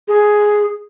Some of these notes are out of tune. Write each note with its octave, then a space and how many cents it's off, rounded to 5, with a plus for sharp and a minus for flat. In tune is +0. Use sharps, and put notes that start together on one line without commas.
G#4 +5